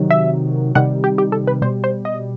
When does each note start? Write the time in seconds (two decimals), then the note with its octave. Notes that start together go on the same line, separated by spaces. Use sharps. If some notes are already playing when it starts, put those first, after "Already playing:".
Already playing: C3 D#3 F#3
0.11 E5
0.75 C3 D#3 G3 F#5
1.04 G4
1.18 G4
1.32 A4
1.47 B4
1.62 B2 G3 C5
1.84 C5
2.05 D#5